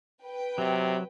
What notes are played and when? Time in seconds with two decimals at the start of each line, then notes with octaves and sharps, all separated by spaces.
0.24 B4 G5
0.58 C3 F#3